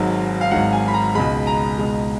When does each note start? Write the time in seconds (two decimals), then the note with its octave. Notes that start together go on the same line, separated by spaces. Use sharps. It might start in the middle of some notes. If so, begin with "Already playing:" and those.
Already playing: G#1 G#2 F#3
0.41 F5
0.51 G#1 G#2 F#3 F#5
0.73 G#5
0.88 B5
0.94 A#5
1.15 C#2 B2 G#3 B5
1.47 A#5
1.78 C#2 B2 G#3